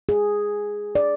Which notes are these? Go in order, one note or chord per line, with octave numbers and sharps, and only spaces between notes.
G#4
D5